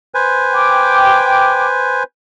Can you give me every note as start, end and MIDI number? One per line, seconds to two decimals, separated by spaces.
0.14 2.03 71
0.14 2.03 72
0.14 2.03 80
0.53 1.65 79
0.53 1.65 86